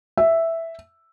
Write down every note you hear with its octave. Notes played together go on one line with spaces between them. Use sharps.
E5